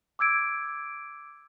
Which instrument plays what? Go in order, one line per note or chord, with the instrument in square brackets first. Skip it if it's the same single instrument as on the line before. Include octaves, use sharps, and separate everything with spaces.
[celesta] D6 E6 G#6 D7